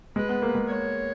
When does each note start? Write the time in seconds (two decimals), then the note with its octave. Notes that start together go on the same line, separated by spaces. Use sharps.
0.16 G#3 B4
0.29 B3
0.42 A#3
0.55 G#3
0.68 C#5